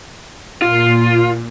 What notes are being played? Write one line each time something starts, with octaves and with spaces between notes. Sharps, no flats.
A#2 F4